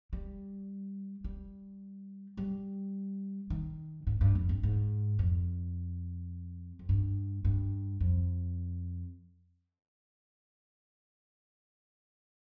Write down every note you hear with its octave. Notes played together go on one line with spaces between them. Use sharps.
G3
G3
G3
D#3
G#2
G2
F2
G2
G#2
F2
F2
G2
G2
F2